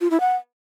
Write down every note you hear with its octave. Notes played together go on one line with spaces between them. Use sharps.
F4
E4
F#5